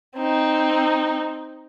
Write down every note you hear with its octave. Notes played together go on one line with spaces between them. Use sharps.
C4 D#4